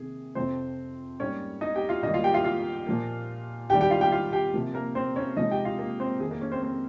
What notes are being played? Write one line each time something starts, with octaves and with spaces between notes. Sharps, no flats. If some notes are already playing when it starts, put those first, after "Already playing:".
Already playing: C3 D#3 A#3 G#4
F2 C3 F3 C4 C5
G#2 G3 A#3 C#4 C#5
D#4 D#5
G4 G5
F4 F5
G#2 D#3 G3 A#3 D#4 D#5
F4 F5
G4 G5
F4 F5
F4 F5
A#2 F3 A#3
G#2 D#3 G3 G4 G5
G4 G5
F4 F5
G4 G5
F4 F5
G4 G5
C3 F3 A#3
A#3 A#4
C4 C5
C#4 C#5
C3 F3 G#3 D#4 D#5
G4 G5
F4 F5
A#3 A#4
C4 C5
F2 D#3 A#3 G#4
A#3 A#4
C#4 C#5
C4 C5
C4 C5